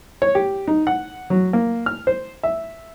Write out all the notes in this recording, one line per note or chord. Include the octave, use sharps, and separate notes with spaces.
C#5
G4
D#4
F#5
F#3
A#3
F6
C5
E5